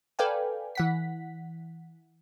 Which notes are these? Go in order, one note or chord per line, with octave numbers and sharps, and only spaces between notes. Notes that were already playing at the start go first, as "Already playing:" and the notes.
A4 B4 D5 F5 G5 G#5
E3 F#5 B6